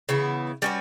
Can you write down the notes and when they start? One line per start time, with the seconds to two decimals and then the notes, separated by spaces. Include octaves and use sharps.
0.09 C#3 E3 B3 E4
0.62 G3 C#4 F#4 B4